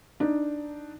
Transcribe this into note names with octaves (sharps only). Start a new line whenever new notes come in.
D4 D#4